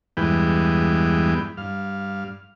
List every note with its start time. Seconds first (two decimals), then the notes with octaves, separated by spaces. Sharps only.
0.17 E2 G2 E3 G#3 B3 G5
1.57 G2 F5